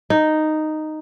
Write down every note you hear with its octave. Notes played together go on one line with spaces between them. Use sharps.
D#4